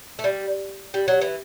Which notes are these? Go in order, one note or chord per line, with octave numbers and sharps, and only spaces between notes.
A3
G3
G3
F#3
E3